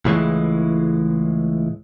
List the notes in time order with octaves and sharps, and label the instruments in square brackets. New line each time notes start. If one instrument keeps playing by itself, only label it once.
[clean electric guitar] C#2 A2 E3 G#3